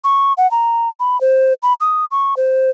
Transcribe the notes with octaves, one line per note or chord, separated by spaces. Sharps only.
C#6
F#5
A#5
B5
C5
B5
D#6
C#6
C5